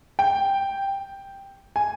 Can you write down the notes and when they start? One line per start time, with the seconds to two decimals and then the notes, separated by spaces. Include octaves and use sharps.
0.19 G5
1.76 G#5